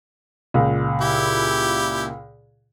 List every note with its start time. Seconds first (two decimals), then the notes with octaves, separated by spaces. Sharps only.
0.54 C#2 A#2
1.01 E4 G4